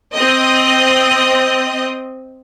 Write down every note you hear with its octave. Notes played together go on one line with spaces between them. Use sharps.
C4 D#5